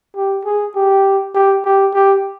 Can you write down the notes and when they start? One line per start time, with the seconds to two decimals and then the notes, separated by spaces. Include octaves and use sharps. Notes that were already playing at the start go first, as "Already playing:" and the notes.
0.16 G4
0.45 G#4
0.76 G4
1.35 G4
1.65 G4
1.94 G4